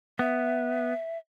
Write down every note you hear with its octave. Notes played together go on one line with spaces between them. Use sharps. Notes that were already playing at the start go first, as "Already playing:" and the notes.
B3 E5